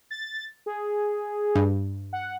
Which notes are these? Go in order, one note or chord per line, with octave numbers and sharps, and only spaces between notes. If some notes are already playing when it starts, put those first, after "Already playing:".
A6
G#4
G2
F#5